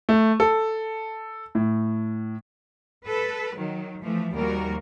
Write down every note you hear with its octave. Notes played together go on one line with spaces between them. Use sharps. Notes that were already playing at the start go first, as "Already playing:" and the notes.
A3
A4
A2
A4 B4
D#3 F#3
E3 F3 A3
D#2 F3 G3 A#3 F#4 A#4